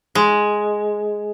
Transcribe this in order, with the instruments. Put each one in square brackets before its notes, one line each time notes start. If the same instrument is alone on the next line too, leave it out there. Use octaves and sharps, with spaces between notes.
[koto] G#3